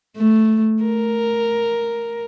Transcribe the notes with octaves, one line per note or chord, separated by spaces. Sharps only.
A3
A#4